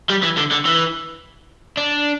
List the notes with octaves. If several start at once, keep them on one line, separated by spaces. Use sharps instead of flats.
G3
E3
D3
D3
E3
D4